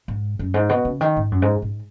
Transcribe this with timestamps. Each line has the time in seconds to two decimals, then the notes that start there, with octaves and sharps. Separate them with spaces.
0.08 G#2
0.39 F#2
0.54 G#2
0.69 B2
0.85 C#3
1.01 D#3
1.17 G#2
1.32 F#2
1.42 G#2
1.62 G#2